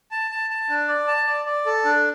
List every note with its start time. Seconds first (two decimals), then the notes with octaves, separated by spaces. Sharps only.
0.11 A5
0.31 A5
0.50 A5
0.69 D4
0.88 D5
1.08 A5
1.27 D5
1.46 D5
1.66 A4
1.85 D4